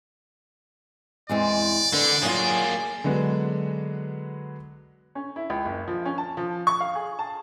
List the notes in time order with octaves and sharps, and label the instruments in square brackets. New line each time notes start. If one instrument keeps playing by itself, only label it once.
[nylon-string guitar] E2 G#3 C4 [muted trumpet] D5
[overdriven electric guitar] D3 [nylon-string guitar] B3 D4
[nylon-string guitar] F#3 F4 [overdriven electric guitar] A#3 G#4
[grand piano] D3 F#3 G#3 B3 F#4
[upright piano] C#4
E4
C#2
F#1
F3
C#4
A5
F3
C#6
F5
G#4
A5